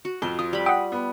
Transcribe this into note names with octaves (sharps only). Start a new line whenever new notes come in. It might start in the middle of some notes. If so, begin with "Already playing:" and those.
F#4
F2 F4 C5
F4 D#6
G3 B5
F#5 G5 D#6
B3